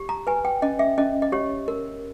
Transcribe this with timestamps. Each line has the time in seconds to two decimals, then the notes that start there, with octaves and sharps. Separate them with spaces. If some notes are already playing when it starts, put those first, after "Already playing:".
Already playing: G4
0.09 A#5
0.27 B4 G#5
0.45 G5
0.62 C#4 D#5
0.79 E5
0.98 C#4 D#5
1.22 D#5
1.32 G4 C#5
1.68 A#4